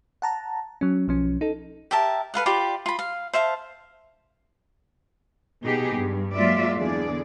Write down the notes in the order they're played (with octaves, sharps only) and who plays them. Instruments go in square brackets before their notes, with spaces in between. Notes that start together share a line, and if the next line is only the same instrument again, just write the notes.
[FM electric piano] F#5 A5 A#5
F#3 C#4
B1 F3 C#4
D#4 A4
[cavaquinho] G4 A#4 E5 A5
A4 B4 F5 F#5
F4 G4 D5 B5
F4 B5
F5
C5 E5 F5 A5
[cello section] B2 B3 D#4 G4 G#4
G2
F#3 G#3 A#3 F4 D5 E5
E2 D3 G#4 D5